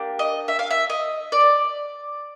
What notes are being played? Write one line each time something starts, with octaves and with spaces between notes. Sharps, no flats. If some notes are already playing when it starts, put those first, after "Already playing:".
Already playing: A#3 D4 G4
D#5
E5
F5
E5
D#5
D5